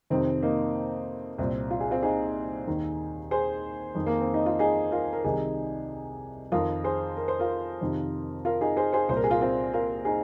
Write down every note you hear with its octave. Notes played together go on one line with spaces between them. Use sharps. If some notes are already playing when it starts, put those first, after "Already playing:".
F2 C3 D#3 C4
A#3 D#4
C2 A#2 C4
F4
G#4
C4 F4
D#4 G#4
D#2 D#3
G#4 C5
F2 D#3
A#3
C4
D#4
F4
D#4 G#4
F4 A#4
A#4
C2 C3 D#3 D#4 G#4
F2 D#3 F4 A#4
G#4 C5
A#4
C5
F4 A#4
F2 C3 D#3
F4 A#4
D#4 G#4
G#4 C5
G#4 C5
C2 A#2 C5
A#4
G#4
F4 A#4
C4 F4
F4 A#4
D#4 G#4